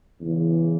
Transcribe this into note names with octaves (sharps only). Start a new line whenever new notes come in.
E2 C#3 E3